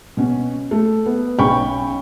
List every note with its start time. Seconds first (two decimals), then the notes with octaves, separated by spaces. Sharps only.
0.17 B2 C#4
0.71 A3
1.06 B3
1.39 B1 C#4 G5 B5 C#6